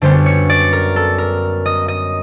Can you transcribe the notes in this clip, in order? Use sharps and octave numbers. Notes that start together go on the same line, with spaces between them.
F#2 D3 G3 B3 C5
C#5
D5
A#4
A4
A#4
D#5
D#5